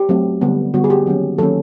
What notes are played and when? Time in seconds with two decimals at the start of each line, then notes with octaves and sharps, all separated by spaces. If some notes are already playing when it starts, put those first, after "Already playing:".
Already playing: G4
0.09 F#3 A3 C4
0.41 D3 G3 B3
0.74 D3 G3 B3 F#4
0.84 G#4
0.90 G4
1.06 D#3 F#3 A#3 C#4
1.38 D#3 F#3 A#3 C#4 A4